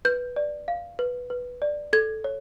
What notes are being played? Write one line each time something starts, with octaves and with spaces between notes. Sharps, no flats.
B4 G6
D5
F5
B4
B4
D5
A4 G#6
C#5